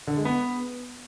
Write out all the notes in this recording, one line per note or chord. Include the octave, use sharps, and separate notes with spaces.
D3
G#3
B3